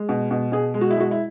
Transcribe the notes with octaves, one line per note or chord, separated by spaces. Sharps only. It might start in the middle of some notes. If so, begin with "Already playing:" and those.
Already playing: G#3
B2
B2
B2 G#4
G#3
F#4
E4
G#3 F#4
E4